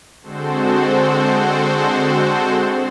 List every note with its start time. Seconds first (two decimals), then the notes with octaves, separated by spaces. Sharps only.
0.22 D3 G#3 C4 F#4 A4 C5